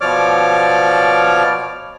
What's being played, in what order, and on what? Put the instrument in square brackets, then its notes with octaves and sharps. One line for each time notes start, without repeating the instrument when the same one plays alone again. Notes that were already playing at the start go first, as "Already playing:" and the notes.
[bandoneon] B2 F3 C#5 D5 D6 F6